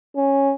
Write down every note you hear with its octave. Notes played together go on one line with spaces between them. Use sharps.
C#4